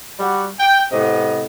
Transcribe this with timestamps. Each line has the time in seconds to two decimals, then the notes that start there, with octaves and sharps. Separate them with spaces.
0.19 G3 F#4
0.59 G5
0.92 A2 C3 B3 D#5